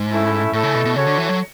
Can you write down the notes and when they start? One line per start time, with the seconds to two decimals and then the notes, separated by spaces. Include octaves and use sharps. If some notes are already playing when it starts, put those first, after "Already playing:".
Already playing: G#2
0.10 A3 C#4 E4 A4 E5
0.53 A2 A3 E4 A4
0.63 C#3
0.74 B2
0.85 B2
0.96 C#3 F#4 A4 C#5
1.07 D3
1.18 E3
1.29 F#3